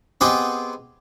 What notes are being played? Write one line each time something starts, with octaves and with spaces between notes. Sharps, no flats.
B3 C4 G4 G#4 B4 D#5